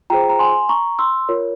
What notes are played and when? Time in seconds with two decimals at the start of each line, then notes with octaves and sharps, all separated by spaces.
0.10 F4 G#4 C5 G5 A#5
0.29 A#5
0.39 G#5 C6
0.69 A#5 C#6
0.99 C6 E6
1.29 F4 A#4 C#5